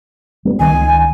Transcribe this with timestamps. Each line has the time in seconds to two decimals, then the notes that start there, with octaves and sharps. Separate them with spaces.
0.45 G3 A#3 B3
0.59 C#2 D#3 G#5